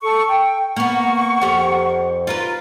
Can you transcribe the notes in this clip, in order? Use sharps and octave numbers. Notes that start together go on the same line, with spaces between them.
A4 C#6
G5
A#3 B3 F#5 C#6
F2 G4 A#4
F4 A#4 B4